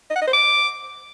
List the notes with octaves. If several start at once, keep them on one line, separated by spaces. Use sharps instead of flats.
D#5
F#5
D#5
C5
D6